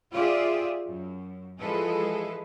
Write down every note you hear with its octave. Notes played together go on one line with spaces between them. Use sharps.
F4 G4 G#4 D5 E5
F#2
E3 F3 G#3 G#4 A4 B4